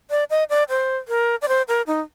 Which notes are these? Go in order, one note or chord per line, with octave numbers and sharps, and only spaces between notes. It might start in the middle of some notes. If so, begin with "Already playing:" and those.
D5
D#5
D5
C5
A#4
D5
C5
A#4
D#4